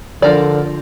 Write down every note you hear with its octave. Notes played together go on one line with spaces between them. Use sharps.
D3 F3 A#4 D5